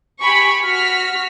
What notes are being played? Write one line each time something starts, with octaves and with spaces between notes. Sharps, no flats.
G4 G#5 B5 C#6
F#4 F6 B6